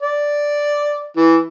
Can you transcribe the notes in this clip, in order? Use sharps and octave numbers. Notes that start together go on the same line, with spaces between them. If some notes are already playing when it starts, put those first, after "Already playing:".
D5
E3